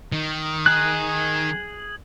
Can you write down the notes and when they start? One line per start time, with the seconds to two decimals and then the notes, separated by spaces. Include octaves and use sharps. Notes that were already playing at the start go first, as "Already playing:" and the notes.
0.12 D#3
0.66 G#4 F#6